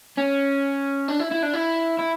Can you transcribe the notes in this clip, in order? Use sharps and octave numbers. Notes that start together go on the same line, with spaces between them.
C#4
D4
E4
E4
D4
E4
E4